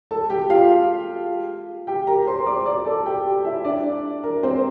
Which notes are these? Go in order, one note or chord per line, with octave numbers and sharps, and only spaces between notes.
A4 A5
G4 G5
F4 F5
G4 G5
A#4 A#5
C5 C6
D5 D6
D5 D6
A4 A5
G4 G5
E4 E5
D4 D5
A#4
C4 C5